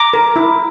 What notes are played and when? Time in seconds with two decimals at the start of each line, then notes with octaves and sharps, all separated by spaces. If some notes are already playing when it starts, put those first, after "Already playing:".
Already playing: A#5 D6
0.13 A#4
0.36 E4